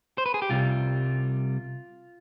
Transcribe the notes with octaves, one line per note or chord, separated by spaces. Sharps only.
C5
B4
G#4
G4
C2 C3 G3 F4